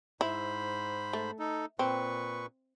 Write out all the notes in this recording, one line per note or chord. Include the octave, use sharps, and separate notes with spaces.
G#2 E4 C5 B5
A3
D#4 A4
A#2 C4 B4 C#6